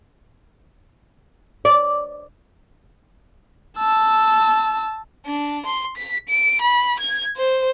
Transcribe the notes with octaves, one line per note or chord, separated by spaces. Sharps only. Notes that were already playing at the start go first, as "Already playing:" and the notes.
D5
A5 E6
D4
C6
B6
D7
B5
G#6
C5